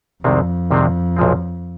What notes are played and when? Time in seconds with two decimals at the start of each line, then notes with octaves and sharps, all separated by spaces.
0.23 C2 F2 C3 D#3 G#3 C4
0.71 C2 C3 D#3 G#3 C4
1.17 B1 A#2 F3 G#3 C4